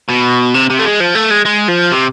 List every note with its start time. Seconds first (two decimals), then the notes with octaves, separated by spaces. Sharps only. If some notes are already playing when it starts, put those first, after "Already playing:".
0.09 B2
0.54 C3
0.70 C3
0.79 A3
0.85 G#3
1.00 F3
1.15 A3
1.31 G#3
1.46 G#3
1.68 F3
1.92 C3